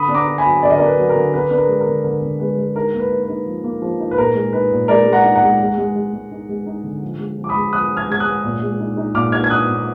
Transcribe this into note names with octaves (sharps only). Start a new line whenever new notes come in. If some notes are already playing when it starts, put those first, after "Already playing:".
Already playing: D3 B5 D#6
D4
A#5 D6
D4
G#5 B5
F#3
D3 D5
D#5
A#4 D5
D4
B4
F#3
A#4
D3
D4 B4
D4 B4
A#4
G#3
A#4
D3
D3 A#4
D3
G#3 B4
G#3
D#4 A#4
A#3
B4
D#4
B4
D#4
F3
A#3
F3
D#4
B4
A#2 A#4
G#3
D#4 B4
A#2
G#3 A#4 D5
G#3
F#5 A#5
D#4
F#5 A#5
G#3
G#3
G#3
G#3
G#3
D#4
G#3
D#4
D3
F3
G#3
F3
D6
B5 D#6
G#3
F3 D#6 F#6
F3
F6 G#6
G#3 G#6
D#6 F#6
G#3
A#2
G#3
D#4
D#4
A#2 D6 F6
D#4 F6 G#6
G#6
D#4 D#6 F#6
A#2